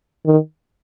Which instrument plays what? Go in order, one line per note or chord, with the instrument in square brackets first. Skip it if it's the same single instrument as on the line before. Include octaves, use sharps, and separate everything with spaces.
[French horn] D#3